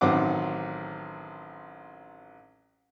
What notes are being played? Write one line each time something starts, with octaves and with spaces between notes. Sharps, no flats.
A1 D#3 F#3 C4 F#5 D6